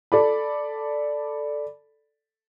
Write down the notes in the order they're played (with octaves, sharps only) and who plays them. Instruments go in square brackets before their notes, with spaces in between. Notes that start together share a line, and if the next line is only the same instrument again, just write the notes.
[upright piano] A4 D5 B5